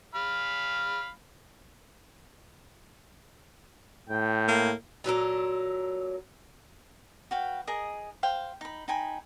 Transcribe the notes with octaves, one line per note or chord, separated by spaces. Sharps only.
F5 B5
A2 G5
A#3
A#2 F#3 A4 A#4
F#4 B4 F5 G5
G#4 A#4 D#5 D#6
C5 F5 G5
D#4 B5
D#4 G5 G#5 B5